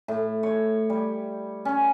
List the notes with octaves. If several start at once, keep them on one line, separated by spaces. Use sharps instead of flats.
A2
C#5
G3
C#4